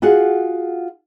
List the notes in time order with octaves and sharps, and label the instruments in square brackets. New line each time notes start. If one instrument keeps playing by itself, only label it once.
[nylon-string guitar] F4 F#4 G#4 F#5